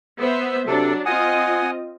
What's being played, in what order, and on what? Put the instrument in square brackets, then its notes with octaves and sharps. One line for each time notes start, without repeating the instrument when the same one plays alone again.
[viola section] B3 C5 E5
[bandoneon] C3 A4 [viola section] F#3 D4
[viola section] C4 F4 D#5 [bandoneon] F#5 G#5 D#6